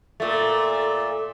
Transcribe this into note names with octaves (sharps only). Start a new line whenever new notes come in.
A#2 A3